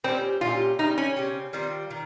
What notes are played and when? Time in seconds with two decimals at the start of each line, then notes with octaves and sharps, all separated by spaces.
0.04 A#2 G3 C4 C#4 G4
0.41 A#2 G3 C#4 F4 G4
0.79 C#3 G3 C4 D#4
0.98 C#4
1.16 C#3 G3 C4
1.53 D#3 G3 C4 F4
1.91 D#3